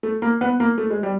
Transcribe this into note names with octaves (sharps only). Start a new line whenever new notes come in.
A3
A#3
B3
A#3
A3
G#3
G3